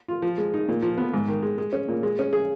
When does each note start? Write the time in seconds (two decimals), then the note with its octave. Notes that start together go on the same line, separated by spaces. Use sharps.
0.08 F4
0.22 F3
0.38 G#3
0.54 D#4
0.69 A#2
0.82 F3
0.98 B3
1.14 G#2
1.28 D#3
1.43 G#3
1.58 G#3
1.73 C#4
1.88 A#2
2.03 G#3
2.19 C#4
2.33 G#4